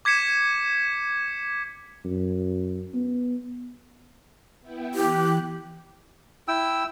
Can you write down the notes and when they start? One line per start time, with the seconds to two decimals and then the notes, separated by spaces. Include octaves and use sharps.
0.05 D6 G#6 B6 C#7 E7
2.04 F#2
2.94 B3
4.61 B3 E4 G5
4.94 E3 G4 F#6
6.48 E4 G5 E6